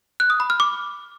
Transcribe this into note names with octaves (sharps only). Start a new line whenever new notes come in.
F#6
D#6
B5
F6
D6